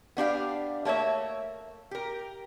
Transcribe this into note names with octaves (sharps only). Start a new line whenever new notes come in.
B3 D4 G4 F5
A3 A#3 C#5 E5
G4 A#4